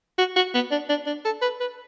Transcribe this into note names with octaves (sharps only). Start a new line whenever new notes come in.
F#4
F#4
B3
D4
D4
D4
A4
B4
B4